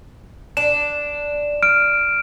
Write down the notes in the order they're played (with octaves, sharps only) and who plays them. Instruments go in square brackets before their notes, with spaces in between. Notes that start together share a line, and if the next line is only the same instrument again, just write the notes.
[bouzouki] D4 [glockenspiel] E7
[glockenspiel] F6 D7